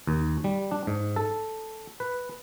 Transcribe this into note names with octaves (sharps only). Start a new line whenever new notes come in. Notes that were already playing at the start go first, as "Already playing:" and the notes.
D#2
G3
D4
G#2
A4
B4